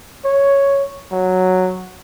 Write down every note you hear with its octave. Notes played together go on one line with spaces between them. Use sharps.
C#5
F#3